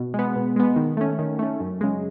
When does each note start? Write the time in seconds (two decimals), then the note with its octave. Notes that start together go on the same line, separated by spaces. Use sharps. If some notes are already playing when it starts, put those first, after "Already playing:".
Already playing: B2
0.14 G#3 B3
0.36 B2
0.56 G#3 B3
0.76 D#3
0.97 A3 C#4
1.19 D#3
1.39 A3 C#4
1.60 F#2
1.81 C#3 G#3